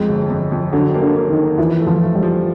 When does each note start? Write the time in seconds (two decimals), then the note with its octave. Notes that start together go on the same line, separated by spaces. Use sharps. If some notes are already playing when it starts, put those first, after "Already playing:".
Already playing: F2 G#3
0.09 G1
0.30 F2
0.52 F2
0.73 D3 F#3
0.94 A#3
1.02 D3
1.16 A#3
1.30 D#3
1.37 A#3
1.58 E3 F3
1.80 A3
1.87 F3
2.01 A3
2.15 G3
2.23 F3